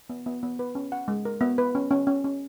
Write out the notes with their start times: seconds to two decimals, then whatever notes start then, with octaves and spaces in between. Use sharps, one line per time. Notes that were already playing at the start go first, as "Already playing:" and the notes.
0.09 B3
0.26 B3
0.43 B3
0.59 B4
0.75 C#4
0.92 F#5
1.08 G#3
1.25 A#4
1.41 B3
1.58 B4
1.75 C#4
1.91 C#4
2.07 C#4
2.24 C#4